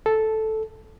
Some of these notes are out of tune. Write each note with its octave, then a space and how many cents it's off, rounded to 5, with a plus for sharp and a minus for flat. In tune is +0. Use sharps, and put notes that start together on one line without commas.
A4 -5